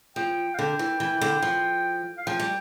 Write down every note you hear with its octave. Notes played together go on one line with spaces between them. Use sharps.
F3 G5
F5
D3 G5
E3
E3
D3
F3
F5
F3 G5
G3